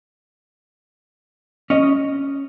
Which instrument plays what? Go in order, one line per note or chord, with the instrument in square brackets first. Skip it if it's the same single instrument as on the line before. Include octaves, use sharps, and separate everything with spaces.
[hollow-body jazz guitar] C#4 D#5